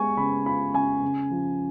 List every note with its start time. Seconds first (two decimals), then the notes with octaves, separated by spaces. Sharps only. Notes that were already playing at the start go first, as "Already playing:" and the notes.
Already playing: G#3 B3 G#5 C#6
0.17 C#3 B5
0.45 F4 B5
0.74 C#3 G#5
1.02 C#3
1.30 F3